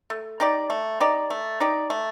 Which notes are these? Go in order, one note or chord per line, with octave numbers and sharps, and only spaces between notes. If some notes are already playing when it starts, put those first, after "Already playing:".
A3
D#4 G4 D5
A3
D#4 G4 D5
A3
D#4 G4 D5
A3